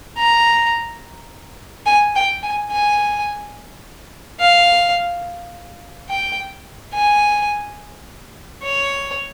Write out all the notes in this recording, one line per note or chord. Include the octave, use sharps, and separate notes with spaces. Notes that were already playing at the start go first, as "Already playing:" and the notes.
A#5
G#5
G5
G#5
G#5
F5
G5
G#5
C#5